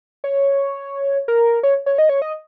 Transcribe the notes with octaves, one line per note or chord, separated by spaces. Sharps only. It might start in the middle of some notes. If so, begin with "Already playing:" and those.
C#5
A#4
C#5
C#5
D#5
C#5
D#5